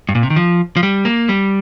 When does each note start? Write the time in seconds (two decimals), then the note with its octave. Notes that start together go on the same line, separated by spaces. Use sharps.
0.09 G2
0.15 A#2
0.23 C3
0.30 D#3
0.36 F3
0.76 F3
0.83 G3
1.05 A#3
1.29 G3